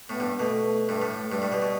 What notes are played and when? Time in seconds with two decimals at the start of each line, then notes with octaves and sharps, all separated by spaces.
0.09 A2 B3
0.20 G2
0.33 B3
0.40 B2 A3
0.89 G2
1.02 A2
1.22 A3
1.32 G2 G3
1.42 A2
1.52 B2
1.62 B2